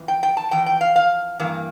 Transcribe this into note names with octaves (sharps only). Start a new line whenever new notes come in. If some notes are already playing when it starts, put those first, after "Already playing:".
Already playing: F2 E3
G5
G5
A5
F2 E3 G5
G5
F5
F5
G2 E3 A#3